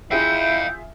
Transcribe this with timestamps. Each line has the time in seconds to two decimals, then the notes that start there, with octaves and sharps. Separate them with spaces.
0.11 E4 F4 G#4 E5 F5 G5 G6